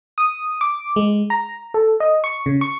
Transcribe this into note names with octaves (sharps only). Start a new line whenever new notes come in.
D#6
D6
G#3
A#5
A4
D#5
C#6
C#3
C#6